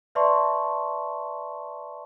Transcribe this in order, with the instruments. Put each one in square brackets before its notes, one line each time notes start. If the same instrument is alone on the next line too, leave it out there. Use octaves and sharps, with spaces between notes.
[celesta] B4 D5 E5 A5 C6 C#6